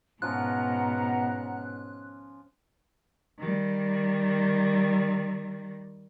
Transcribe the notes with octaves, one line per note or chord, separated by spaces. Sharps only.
G#2 B2 F3 C#4 F4 F#5 A#5 F#6
D#3 G3